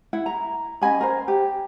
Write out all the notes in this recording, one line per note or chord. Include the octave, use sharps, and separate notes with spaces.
E4 F#5
A#5
C#4 D#5 G#5 B5
A#4 C5
G4